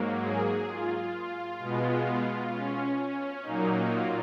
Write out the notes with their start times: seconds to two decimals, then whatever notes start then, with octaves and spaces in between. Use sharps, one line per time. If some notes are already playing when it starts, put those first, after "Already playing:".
Already playing: G#2 F#3 A#3
0.21 G#4
0.68 F4
1.58 B2 G#3 B3
2.51 C#4
2.97 C#4
3.43 A#2 F#3 A#3 D#4
3.89 F4